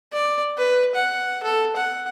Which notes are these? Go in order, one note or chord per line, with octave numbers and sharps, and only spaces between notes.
D5
B4
F#5
A4
F#5